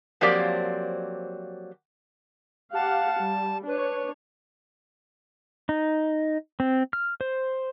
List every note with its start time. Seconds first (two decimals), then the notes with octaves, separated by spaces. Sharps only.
0.21 F3 F#3 A#3 C4 G4 D5
2.74 G4 F5 F#5 A5
3.20 G3
3.67 D4 B4 C#5
5.69 D#4
6.60 C4
6.93 F6
7.21 C5